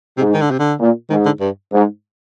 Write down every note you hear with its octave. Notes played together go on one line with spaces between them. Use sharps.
G#2 C3
D#3
D3
C3
D3
A#2
G#2 D#3
D3
G2
G#2